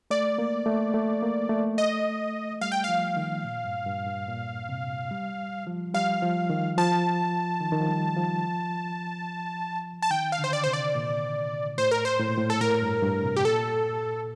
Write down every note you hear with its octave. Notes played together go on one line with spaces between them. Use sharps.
A3 D5
A#3
A3
A3
A#3
A3
D#5
G3 F5
G5
F3 F5
D#3
A#2
G2
G2
G2
A#2
C3
G3
F3
G3 F5
F3
D#3
F3 A5
D#3
D#3
F3
G3
F3
A5
D#3 G5
F5
D3
C5
D5
C3 C5
D5
A#2
A2 C5
A#4
C5
A2
A#2
A2
A4
A2 A#4
G2
G2
C3
G4
A#2 A4